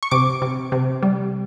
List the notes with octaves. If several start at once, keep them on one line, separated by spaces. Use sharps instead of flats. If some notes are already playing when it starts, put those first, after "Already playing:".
C#6
C3 D6
C3
C3
G3